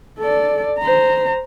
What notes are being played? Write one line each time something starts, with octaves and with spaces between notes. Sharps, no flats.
A4 D5
C5 A#5